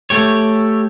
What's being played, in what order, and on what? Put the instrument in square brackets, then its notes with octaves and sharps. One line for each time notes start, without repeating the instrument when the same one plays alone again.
[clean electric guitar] A3 G4 C#5